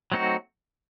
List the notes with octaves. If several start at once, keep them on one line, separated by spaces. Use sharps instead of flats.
F#3 A3 C4 D#4 F#4